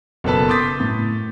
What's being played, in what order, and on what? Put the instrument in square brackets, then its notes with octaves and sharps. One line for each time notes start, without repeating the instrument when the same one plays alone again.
[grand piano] F#1 B2 A4 B4 A5
C6 D6 D#6 G6 A6 B6
A2